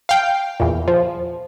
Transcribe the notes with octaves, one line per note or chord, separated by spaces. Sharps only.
F5 G5
E2 A#2
F3